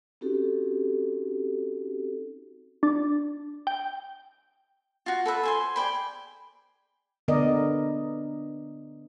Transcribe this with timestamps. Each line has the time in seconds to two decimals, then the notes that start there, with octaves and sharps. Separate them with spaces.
0.21 C4 C#4 D#4 F#4 G4 A4
2.83 D4
3.67 G5
5.06 F4 F#4
5.25 A4 B4 E5
5.43 C5 G#5 C6
5.76 G#4 D5 G5 B5
7.28 D3 B3 A#4 D5 D#5